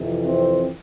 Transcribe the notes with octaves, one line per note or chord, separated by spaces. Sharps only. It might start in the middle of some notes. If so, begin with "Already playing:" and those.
Already playing: F2 C3 E3
C4